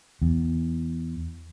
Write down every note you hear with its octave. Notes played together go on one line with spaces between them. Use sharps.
E2